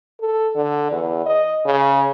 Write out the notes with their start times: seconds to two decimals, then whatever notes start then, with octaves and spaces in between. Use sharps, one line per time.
0.21 A4
0.56 D3
0.92 E2
1.26 D#5
1.66 C#3